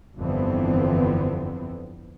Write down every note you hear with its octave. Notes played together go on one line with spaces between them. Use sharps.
G1 F2 D3 E3 B3 C4